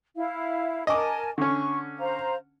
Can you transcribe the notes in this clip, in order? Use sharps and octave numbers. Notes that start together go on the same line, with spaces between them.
E4 F5
A#4 D#5 G#5 A5 D6
D3 C#4 C#6
C5 F5 A#5